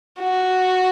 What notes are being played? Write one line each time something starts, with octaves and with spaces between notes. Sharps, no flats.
F#4